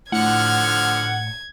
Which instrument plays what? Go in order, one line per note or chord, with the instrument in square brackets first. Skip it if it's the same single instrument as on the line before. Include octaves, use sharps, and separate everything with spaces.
[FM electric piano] A2 C#7 [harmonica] D3 F3 F6 [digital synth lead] F#5 [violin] G#6